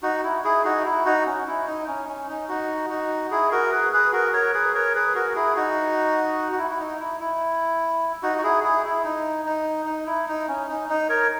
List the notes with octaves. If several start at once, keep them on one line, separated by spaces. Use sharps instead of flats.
D#4 F#4
E4
E4 G#4
D#4 F#4
E4
D#4 F#4
C#4
E4
D#4
C#4
C#4
D#4
D#4 F#4
D#4 F#4
E4 G#4
F#4 A#4
G#4 B4
G#4 B4
F#4 A#4
A#4 C#5
G#4 B4
A#4 C#5
G#4 B4
F#4 A#4
E4 G#4
D#4 F#4
F#4
E4
E4
D#4
E4
E4
D#4 F#4
F#4
E4 G#4
E4 G#4
E4
D#4
D#4
D#4
E4
D#4
C#4
D#4
D#4
A#4 C#5